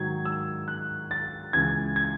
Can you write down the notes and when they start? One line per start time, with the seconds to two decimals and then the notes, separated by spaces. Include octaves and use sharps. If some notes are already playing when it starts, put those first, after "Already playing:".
Already playing: G#2 D#3 F#3 G#6
0.25 E6
0.68 F#6
1.11 A6
1.53 C#2 C#3 E3 G#6
1.96 G#6